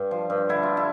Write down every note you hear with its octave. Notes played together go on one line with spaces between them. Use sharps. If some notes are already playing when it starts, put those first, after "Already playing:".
Already playing: G2
F3
G2
D3 E4
F4
E4